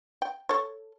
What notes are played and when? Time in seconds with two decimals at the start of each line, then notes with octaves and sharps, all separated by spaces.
0.22 G5
0.49 A4 C#5